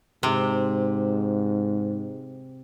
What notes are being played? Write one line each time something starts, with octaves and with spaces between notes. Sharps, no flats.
G#2 C3